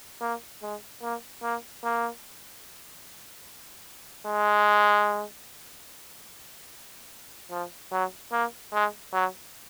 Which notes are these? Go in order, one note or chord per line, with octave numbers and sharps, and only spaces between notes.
A#3
G#3
A#3
A#3
A#3
G#3
F3
F#3
A#3
G#3
F#3